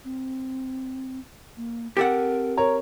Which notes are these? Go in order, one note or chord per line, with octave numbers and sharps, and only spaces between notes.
C4
A#3
C4 G4 A4 A#4 F#5
A#4 C#5 A#5